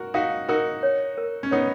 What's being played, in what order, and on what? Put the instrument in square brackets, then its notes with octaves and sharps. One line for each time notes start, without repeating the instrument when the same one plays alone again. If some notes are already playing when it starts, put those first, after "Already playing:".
Already playing: [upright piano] F#4 A#4
[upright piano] D#4 F#4 [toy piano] F5
[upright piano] D#4 F#4 [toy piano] A#4
[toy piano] C#5
A#4
[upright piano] C#4
[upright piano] B3 D#4 [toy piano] C#5